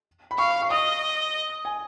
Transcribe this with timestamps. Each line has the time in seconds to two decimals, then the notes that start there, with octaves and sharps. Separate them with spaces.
0.31 B5
0.38 F5 C#6
0.62 C#6
0.70 D#5 D#6
1.65 G#5